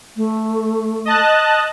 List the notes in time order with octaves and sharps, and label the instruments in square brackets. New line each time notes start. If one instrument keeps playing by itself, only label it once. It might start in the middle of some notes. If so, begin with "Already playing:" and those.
[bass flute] A3
[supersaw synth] D#5 A5 F#6